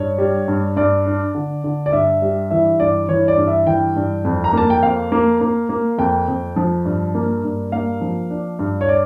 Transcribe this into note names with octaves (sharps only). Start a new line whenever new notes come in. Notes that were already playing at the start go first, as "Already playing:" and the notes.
Already playing: G2 C#5
G3
G2
G2 D5
D4
D3
D3
D5
G2 E5
G3
E3 E5
G2 D5
E3 C#5
D5
G2
E5
E3 G5
G2
F2
A#5
A#3 A5
G5
F2 F5
A#3
A#3
A#3
F2 G5
F2
F3
G2
A#3
G2
A#3 F5
F3
D4
G2
C#5
D5